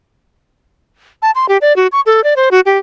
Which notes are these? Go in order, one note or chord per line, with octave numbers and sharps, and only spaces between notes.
A5
C6
G4
D5
F#4
C#6
A4
D5
C5
F#4
G4